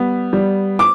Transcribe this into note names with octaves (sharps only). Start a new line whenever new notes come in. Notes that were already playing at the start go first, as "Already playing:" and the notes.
Already playing: G3 B3
G3
D6